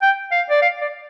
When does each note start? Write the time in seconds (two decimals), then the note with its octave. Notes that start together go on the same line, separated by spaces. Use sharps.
0.01 G5
0.31 F5
0.49 D5
0.61 F5
0.81 D5